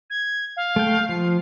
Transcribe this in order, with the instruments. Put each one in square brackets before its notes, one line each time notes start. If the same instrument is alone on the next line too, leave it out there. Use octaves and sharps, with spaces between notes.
[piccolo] G#6
F5
[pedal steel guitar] A3 G5
[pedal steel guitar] F3 [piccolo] C7